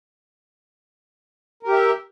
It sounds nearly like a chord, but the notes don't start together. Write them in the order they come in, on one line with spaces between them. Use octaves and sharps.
A#4 G4 E5